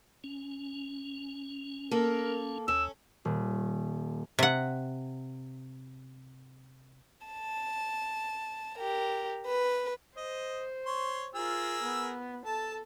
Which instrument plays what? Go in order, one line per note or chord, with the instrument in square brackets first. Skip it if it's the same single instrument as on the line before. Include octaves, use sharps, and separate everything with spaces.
[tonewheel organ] C#4
[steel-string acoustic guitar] A#3 A4 [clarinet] A#4
[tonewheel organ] D#2 [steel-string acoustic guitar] C#4 [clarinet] E6
[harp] D#1
[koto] C3 F#5
[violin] A5
G4 A#4
B4
[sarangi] C5 [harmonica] D#5
[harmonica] C#5 C6
[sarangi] F4 [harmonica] G#4 A#4 E6
[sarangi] B3
[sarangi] A4 [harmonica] A5